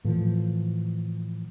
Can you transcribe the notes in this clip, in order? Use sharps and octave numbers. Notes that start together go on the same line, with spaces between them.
A2 E3 F3